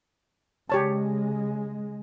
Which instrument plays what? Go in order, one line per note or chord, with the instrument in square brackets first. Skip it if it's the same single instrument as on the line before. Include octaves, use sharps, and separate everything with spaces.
[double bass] C#3 [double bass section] G#3 [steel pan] G4 C#5 A5